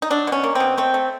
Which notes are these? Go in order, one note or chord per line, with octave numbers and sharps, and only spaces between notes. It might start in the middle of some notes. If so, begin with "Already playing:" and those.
D#4
F#3 D4
B2 C#4
A#3
B2 C4
A3 C4
A3